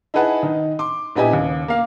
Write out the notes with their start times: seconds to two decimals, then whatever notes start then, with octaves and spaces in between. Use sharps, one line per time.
0.14 D#4 E4 G#4 B4 F#5 A5
0.43 D#3 D#4
0.79 C6 D6
1.16 A#1 B3 E4 G4 D#5 G#5
1.31 D#2 C#3
1.68 A#3 F5